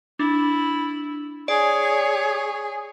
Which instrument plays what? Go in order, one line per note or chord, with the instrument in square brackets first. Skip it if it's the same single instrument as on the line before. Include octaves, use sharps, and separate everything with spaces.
[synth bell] D4 [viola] E4
[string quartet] G#4 [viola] C#5 [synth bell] D5